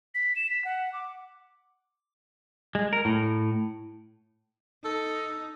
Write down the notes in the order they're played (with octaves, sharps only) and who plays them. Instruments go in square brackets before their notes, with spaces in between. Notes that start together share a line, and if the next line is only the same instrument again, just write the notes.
[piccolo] B6
E7
B6
F#5
D6
[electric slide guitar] G#3
A#4
A2
[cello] D#4 [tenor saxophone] A4